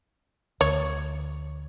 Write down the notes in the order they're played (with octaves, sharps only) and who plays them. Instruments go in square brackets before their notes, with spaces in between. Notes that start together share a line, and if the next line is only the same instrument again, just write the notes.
[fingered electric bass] D2 [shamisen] C#5